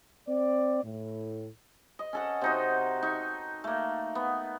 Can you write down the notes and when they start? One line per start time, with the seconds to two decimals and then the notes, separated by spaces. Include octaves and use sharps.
0.28 C4 D5
0.84 A2
1.99 D#5
2.13 C#4 A4 F#5
2.41 C3 D#4 F#4
3.03 D#4 C#6
3.64 A3 A#3
4.15 B3